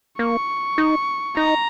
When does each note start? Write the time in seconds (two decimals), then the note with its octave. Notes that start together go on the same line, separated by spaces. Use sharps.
0.19 A#3 C#6
0.78 D#4
1.37 D#4 A#5